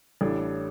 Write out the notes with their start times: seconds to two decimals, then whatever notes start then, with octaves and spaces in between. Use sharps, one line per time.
0.21 A1 A2 G3 D4 A4